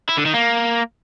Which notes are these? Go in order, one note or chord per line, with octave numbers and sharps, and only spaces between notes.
E4
D3
D#3
A#3